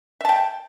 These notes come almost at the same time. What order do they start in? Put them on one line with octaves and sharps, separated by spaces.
E5 A5 G5